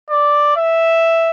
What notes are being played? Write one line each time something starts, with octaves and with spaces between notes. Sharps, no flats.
D5
E5